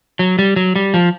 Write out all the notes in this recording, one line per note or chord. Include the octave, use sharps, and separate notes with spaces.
F#3
G3
F#3
G3
F3